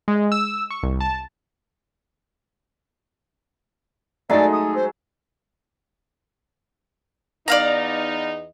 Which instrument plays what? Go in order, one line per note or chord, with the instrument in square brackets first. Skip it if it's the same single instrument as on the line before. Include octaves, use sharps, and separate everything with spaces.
[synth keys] G#3
E6
C#6
C2
A5
[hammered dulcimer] F#3 G#3 A4 [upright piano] A3 D#4 [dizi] D5
[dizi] D#6
C5
[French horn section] E2 B3 D#4 [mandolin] D5 F5 A#5